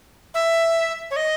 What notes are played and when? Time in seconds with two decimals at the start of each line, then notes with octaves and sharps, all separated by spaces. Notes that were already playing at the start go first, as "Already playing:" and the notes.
0.34 E5
1.11 C#5
1.16 D#5